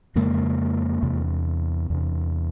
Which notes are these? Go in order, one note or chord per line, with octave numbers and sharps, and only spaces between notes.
F2 C#3 G#3 A#3
E2 C3
E2 C3